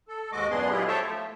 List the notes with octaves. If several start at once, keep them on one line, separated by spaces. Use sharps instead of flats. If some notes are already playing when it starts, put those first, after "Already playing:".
A4
D#2 G#2 G#3 F#4 D#5 D6
F#2 A#2 B3 D4 G#4 C6
F#3 G#3 E4 F4 G4 G#4
A4 C5 C#5 E5 G5 A5
F3 A3